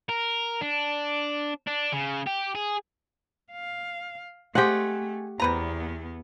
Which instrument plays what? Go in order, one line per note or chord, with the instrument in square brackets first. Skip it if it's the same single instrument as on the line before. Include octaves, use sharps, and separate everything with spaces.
[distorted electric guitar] A#4
D4
D4
C#3
G4
G#4
[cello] F5
[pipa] G#3 C4 G#4 [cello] A3 [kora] G4 F#5
[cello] E2 B3 [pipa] C3 B4 A#5